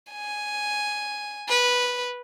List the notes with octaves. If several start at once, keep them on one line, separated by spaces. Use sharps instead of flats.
G#5
B4